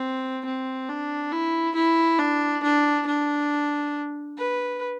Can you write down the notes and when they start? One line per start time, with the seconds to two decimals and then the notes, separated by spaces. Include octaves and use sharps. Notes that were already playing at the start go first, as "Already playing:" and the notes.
Already playing: C4
0.45 C4
0.89 D4
1.32 E4
1.75 E4
2.19 D4
2.63 D4
3.07 D4
4.37 B4